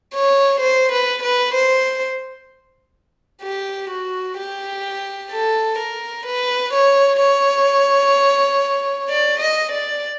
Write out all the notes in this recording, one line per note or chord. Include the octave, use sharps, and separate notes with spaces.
C#5
C5
B4
B4
C5
G4
F#4
G4
A4
A#4
B4
C#5
C#5
D5
D#5
D5